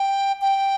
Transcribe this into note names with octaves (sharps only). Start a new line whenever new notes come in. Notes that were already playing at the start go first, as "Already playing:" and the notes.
Already playing: G5
G5